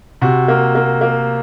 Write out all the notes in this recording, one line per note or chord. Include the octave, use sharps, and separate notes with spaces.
C3 F#4
A#3
A#3
A#3